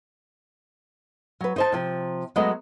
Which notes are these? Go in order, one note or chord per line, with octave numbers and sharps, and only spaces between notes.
F#3 B4
D#4 C5 A5
C3 F3
F#3 G#3 A3 B3 F#4 D#5